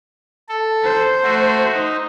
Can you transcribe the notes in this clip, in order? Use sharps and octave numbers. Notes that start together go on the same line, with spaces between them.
A4
C5
A3 F#4
D#4